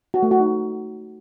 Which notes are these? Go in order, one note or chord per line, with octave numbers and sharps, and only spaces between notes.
F#4
A3
F#4
D#4